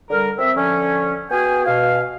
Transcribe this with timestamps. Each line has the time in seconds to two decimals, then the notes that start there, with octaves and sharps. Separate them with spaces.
0.10 D3 G3 A#4
0.38 C4 E5
0.56 D3 F3 C#4
1.30 B3 F#4 G#4 G5 G#5
1.66 B2 F5